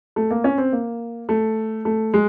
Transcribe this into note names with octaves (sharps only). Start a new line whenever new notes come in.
A3
A#3
C#4
C4
A#3
A3
A3
G#3